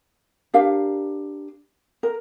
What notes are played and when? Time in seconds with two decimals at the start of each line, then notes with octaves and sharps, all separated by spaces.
0.54 D4 G4 A#4 F5
2.03 A#4